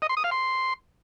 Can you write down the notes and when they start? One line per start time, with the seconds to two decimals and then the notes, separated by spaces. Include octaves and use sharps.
0.02 D#5
0.09 C6
0.17 D#6
0.24 F5
0.31 C6